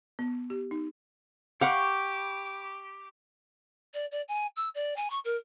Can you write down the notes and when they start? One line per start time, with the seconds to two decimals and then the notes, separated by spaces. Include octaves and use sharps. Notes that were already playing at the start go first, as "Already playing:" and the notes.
0.19 B3
0.50 G4
0.71 D#4
1.61 G4 F5 F#5 B5 C#6 D6
3.94 D5
4.11 D5
4.28 G#5
4.56 E6
4.74 D5
4.96 G#5
5.10 C#6
5.25 A#4